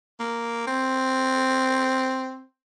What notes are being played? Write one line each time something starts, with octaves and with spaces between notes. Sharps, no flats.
A#3
C4